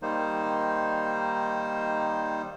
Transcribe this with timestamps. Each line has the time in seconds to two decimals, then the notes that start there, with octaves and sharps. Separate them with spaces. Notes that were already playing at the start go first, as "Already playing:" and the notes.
0.02 D#3 G3 A#3 D#4 C5